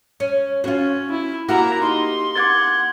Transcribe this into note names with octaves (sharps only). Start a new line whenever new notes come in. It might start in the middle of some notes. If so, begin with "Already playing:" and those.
C#4
C#4 F4 F#4
E4
A#3 E4 F#4 G4 F#5 A#5
D#4 C6
F#5 D6 G#6 A6